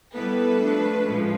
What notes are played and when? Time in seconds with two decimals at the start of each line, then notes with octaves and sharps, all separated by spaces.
0.16 G3 B3 E4 A4 B4
0.61 F3 A3 D4
1.06 A2 F3 G#3 C#4